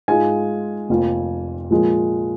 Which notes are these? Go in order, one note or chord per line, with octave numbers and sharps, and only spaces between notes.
G#2 G#3 F4 G#5
F1 F2 F3 A#3 F4
A#2 F3 G#3 F4